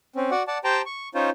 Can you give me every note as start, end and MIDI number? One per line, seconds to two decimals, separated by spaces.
0.16 0.30 60
0.16 0.30 61
0.31 0.43 66
0.31 0.43 74
0.31 0.43 78
0.47 0.58 74
0.47 0.58 78
0.47 0.58 81
0.64 0.82 67
0.64 0.82 72
0.64 0.82 79
0.64 0.82 81
0.64 0.82 82
0.86 1.09 85
1.15 1.30 61
1.15 1.30 63
1.15 1.30 65
1.15 1.30 72
1.15 1.30 73